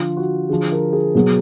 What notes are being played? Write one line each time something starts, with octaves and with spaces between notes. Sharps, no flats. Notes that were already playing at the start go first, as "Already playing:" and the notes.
Already playing: D3 F3 F4
F#4
D3 F3 G#4
A#4
G#4
B2 F#3 G#4